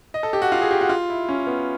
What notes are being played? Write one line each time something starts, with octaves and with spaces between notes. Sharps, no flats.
D#5
A4
G4
F#4
F4
G#4
G4
F#4
F4
E4
C#4
B3